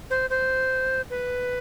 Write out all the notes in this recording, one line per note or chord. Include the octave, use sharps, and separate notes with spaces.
C5
C5
B4